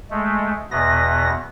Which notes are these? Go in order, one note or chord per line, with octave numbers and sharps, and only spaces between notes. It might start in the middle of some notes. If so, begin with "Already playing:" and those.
G#3 A3
E2 B2 B3 A#6